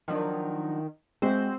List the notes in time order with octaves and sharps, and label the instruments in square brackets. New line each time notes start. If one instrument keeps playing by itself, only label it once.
[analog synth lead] D#3 [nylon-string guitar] F3 F#3 D4
[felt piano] G#3 [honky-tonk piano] C4 [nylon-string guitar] F#4 E5 [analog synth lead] C5